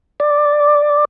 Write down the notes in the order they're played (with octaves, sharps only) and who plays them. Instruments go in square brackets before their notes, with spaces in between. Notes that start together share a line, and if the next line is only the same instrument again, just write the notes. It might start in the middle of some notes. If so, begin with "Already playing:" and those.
[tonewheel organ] D5